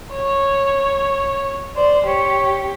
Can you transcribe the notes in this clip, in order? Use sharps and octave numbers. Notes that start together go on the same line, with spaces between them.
C#5
C5 D5
G4 C#5